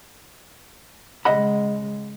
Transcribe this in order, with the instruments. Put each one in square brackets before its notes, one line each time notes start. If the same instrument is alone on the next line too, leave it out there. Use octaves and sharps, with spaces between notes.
[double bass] C#3 G#3 [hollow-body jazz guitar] D#5 F#5 B5